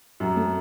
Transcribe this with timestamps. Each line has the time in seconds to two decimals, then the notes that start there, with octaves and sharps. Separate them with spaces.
0.20 F#2 F#3
0.37 A3